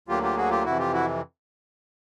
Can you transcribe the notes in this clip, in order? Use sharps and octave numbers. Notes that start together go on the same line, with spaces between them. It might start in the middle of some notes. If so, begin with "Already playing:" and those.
D2 D3 F#3 A#3 F4 G4
F4 G4
F#4 G#4
F4 G4
F2 C3 E3 E4 F#4
F4 G4
E4 F#4